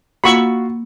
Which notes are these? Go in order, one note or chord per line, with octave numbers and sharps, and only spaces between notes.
A#3 F4 F#4 B5 C#6 E6